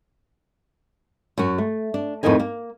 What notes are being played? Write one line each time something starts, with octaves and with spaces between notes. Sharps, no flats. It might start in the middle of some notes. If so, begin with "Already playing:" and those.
F#2 C#4 F#4
A3
D4
F2 A2 B3 D#4 A#4 G#5
A#3